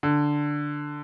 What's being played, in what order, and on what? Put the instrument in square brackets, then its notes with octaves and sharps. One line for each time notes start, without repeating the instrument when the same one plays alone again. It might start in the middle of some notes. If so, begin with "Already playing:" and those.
[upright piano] D3